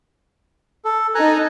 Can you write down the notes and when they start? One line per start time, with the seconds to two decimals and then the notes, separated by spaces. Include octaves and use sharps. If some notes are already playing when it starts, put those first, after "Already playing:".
0.85 A4
1.15 D#4 A4 G#5 A#5 F#6